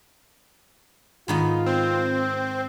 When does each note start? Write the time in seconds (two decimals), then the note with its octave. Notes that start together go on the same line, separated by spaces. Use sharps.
1.28 G#2 D#3 B3 F4
1.66 C4 C5